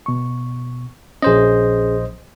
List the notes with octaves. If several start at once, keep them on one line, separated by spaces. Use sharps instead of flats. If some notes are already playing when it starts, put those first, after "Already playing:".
B2 C#6
A#1 C#4 G#4 C5 D#5